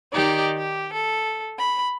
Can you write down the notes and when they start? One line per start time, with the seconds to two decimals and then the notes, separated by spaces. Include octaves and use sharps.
0.13 D#3 D#4 G4 D5
0.58 G4
0.93 A4
1.58 B5